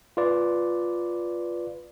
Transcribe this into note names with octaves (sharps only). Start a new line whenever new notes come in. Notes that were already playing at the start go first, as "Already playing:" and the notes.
F4 B4 D5